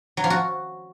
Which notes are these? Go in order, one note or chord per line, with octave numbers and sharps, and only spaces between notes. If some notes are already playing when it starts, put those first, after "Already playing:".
F#3
F3
F#4